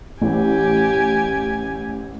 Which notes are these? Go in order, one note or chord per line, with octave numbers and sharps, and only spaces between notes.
A1 G4 G#5